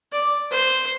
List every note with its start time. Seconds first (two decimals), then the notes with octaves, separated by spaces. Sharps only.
0.12 D5
0.51 C5